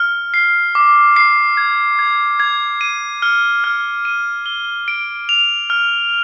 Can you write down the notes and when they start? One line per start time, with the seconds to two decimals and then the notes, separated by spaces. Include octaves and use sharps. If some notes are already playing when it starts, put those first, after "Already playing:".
Already playing: F6
0.34 C7
0.75 D6
1.16 C7
1.57 G#6
1.99 G#6
2.40 G#6
2.81 D#7
3.22 F6
3.64 F6
4.05 D#7
4.46 G7
4.88 D7
5.29 F7
5.70 F6